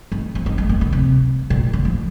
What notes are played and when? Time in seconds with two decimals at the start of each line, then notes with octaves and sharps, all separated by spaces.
0.12 D#3
0.35 F3
0.46 D#3
0.58 A#3
0.69 A#3
0.81 D3
0.93 C3
1.50 A#2
1.73 D3
1.85 F3